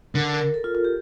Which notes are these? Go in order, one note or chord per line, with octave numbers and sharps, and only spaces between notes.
D3 A#4
A#4
A#4
A4
F4
F4
G4